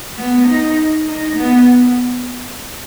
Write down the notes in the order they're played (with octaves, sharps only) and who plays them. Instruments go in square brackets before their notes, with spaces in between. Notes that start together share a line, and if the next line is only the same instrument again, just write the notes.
[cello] B3
D#4
D#4
B3